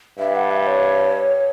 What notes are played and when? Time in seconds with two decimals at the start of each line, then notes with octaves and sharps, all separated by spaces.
0.19 G2 E5
0.35 F#5
0.51 E5
0.66 C#5